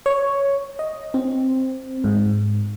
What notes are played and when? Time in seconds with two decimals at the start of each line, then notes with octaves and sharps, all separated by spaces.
0.06 C#5
0.79 D#5
1.14 C4
2.04 G#2